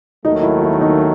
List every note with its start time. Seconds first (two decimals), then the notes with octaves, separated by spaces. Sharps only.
0.24 D#2 D#3 F#3 A3 D#4
0.43 E4
0.62 E4
0.81 D#4